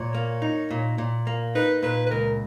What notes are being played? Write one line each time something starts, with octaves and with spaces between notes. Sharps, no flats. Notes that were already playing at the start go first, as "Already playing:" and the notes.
Already playing: A#2 C#5
A#3
D#4
A#2
A#2
A#3
D#4 B4
A#2 B4
B4
C#2 A#4